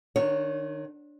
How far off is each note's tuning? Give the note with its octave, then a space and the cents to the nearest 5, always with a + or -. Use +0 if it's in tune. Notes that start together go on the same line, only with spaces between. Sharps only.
D#3 -25 D4 +0 C#5 +0